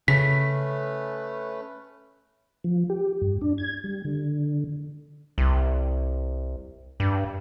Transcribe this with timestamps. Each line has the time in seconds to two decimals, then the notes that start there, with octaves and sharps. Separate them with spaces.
0.08 C#3 A3 C#4 B4 B6
2.64 F3
2.90 G4
3.22 G2
3.41 D4
3.58 G#6
3.84 G3
4.05 D3
5.38 C2
7.00 G2